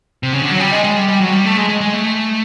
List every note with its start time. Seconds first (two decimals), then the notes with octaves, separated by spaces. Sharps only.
0.23 C3
0.33 C#3
0.42 D3
0.51 F#3
0.60 G3
0.72 G#3
0.84 G#3
0.96 G3
1.08 G3
1.21 F#3
1.32 G3
1.45 A3
1.57 G#3
1.69 G#3
1.81 G#3
1.94 A3